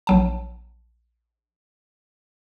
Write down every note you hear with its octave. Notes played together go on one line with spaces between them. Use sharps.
A#1 F#3 A5